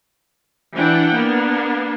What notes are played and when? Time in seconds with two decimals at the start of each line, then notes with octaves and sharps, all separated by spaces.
0.73 E3 D4 E4 F#5 G5
1.13 A#3 B3 D4